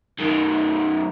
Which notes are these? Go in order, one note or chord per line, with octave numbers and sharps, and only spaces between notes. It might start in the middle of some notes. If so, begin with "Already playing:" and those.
F#2 D#3